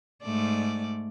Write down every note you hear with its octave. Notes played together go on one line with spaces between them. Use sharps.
G#2 A3 D5